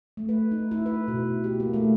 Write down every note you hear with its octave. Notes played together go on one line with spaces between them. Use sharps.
A3
B4
D#4
E4
B4
B2
G4
A#3
A3